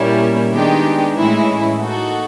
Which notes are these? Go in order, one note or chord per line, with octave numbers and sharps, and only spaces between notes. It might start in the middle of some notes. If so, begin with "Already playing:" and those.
Already playing: A#2 G3 A#3 C#4 E4
D#3 G#3 B3 D4 G4
A2 E3 G#3 C#4 E4
A#3 D#4 F#4 A4